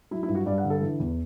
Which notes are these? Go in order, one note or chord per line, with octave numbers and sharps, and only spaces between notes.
F#3 E4
E4
G2
F#4
G2 D5
F#5
D3
A4
E3
E2